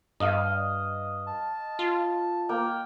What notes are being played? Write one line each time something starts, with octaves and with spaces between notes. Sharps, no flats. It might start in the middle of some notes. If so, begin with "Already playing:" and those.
G2 D#5 F5
A5
F4
A#3 G5